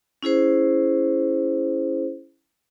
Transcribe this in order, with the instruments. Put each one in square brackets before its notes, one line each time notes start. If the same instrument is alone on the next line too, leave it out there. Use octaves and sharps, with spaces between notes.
[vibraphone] C#4 E4 G#4 C5